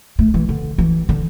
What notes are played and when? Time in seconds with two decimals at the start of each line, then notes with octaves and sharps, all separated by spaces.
0.19 A3
0.34 E3
0.49 D3
0.78 E3
1.09 D3